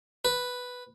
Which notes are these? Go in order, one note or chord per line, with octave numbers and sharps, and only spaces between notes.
B4